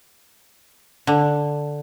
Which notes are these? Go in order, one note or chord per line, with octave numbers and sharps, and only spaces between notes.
D3